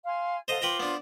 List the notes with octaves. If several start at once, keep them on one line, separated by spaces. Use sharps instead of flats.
F5 G#5 C6
A4 C5 D#5 F5 F#5 A#5
F4 B4 C5 G5 A#5 D6
B3 D4